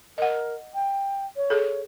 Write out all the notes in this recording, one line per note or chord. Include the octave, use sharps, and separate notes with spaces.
A#4 D#5 F#5
G5
C#5
G#4 A4